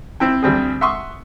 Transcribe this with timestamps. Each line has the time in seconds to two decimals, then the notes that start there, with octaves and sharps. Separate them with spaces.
0.20 C4 E4 G5
0.43 D2 G3 C4 G#4
0.81 E5 F#5 C6 C#6 D#6